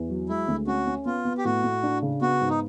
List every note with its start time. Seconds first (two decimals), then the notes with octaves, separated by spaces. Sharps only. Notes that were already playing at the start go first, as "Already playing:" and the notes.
Already playing: E2
0.10 F#3
0.29 G#3 E4
0.48 D2
0.67 C#4 F#4
0.87 C#4
1.05 B3 F4
1.25 B3
1.38 G4
1.44 A2 F#4
1.64 A2
1.83 D4
2.02 C#3
2.21 B3 F#4
2.41 G#2
2.49 D#4